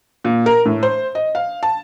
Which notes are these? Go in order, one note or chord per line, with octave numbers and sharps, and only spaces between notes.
A#2
A#4
A2
C5
D#5
F5
A5